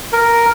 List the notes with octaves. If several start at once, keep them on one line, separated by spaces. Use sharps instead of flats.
A#4